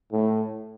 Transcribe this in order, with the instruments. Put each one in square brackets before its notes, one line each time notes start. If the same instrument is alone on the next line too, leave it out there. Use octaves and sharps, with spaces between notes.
[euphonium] A2